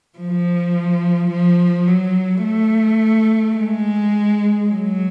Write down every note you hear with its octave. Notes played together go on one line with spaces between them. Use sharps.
F3
F3
F#3
A3
G#3
F#3